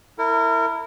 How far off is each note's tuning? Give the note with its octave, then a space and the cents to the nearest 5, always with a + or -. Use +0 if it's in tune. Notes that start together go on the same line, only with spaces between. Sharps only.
E4 -5 A#4 -30